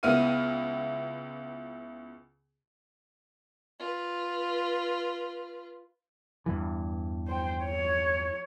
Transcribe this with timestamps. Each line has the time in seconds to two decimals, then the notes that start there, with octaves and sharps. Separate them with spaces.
0.03 C#2 B3 E4 F6 D#7
3.79 F4 B4
6.46 E2 G2 E3
7.27 C5 G5
7.64 C#5